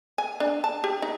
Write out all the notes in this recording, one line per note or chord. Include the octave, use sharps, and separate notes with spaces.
G#5
D4
A5
G4
D#4